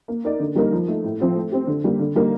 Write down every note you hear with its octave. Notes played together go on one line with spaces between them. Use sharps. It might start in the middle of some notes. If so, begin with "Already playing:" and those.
A#3
D#4 A#4 D5
D3
G3 A#3 D#4 A#4
F3
A3 D#4
A2
F3 C4 F4
A3
C4 G4
D3
G3 A#3
D3
G3 A#3 D#4 A#4